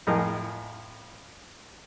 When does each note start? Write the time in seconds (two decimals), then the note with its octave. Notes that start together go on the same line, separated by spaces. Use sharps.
0.07 F2 A2 G#4 A#4 D#5